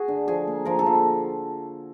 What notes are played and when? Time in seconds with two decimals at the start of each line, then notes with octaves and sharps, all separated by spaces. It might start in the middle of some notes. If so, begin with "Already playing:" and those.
Already playing: F#4 G#4
0.08 D3
0.28 F3 G#4
0.47 A#3
0.65 F3 A#4
0.79 A4
0.86 F3